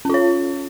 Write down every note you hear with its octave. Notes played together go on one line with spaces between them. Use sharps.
C#4 F4 C#5